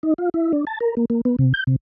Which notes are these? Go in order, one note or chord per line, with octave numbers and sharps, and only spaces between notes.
D#4
F4
E4
D4
A5
A#4
A#3
A#3
B3
C3
G6
C3